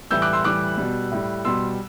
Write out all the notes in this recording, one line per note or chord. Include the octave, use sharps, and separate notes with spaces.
A2 E3 G3 E6 G6
D6 F#6
C6 E6
A2 E3 G3 D6 F#6
B2 G3
A2 G3
B2 G3 C6 E6